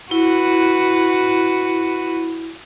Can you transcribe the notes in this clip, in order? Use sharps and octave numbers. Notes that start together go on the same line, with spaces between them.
E4 F#4 B4